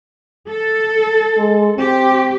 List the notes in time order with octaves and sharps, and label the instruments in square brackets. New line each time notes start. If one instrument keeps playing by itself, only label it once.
[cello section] A4
[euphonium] G#3
[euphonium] C4 [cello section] G4